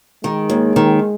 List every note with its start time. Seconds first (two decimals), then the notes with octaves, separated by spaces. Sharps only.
0.24 D#3 G#3
0.50 D#2
0.76 D#3